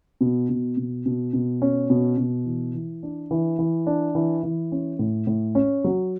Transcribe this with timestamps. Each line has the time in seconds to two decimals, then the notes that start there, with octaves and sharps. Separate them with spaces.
0.21 B2
0.49 B2
0.77 B2
1.06 B2
1.33 B2
1.62 C#4
1.90 B2
2.18 B2
2.46 E3
2.74 E3
3.03 D4
3.31 E3
3.59 E3
3.87 D4
4.15 E3
4.43 E3
4.72 C#4
4.99 A2
5.27 A2
5.55 C#4
5.84 F#3